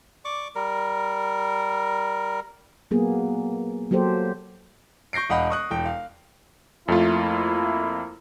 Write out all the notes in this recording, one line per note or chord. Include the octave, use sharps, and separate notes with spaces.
D5 C#6 D6
G3 A#4
F#3 A#3 B3 G#4
F#3 A#3 G4 A4 C5
C#6 G6 A#6 C7 D7
E1 D#5 F5 F#5 B5
C#6 D#6 F#6
E1 G5
F5
F2 A3 A#3 E4 F4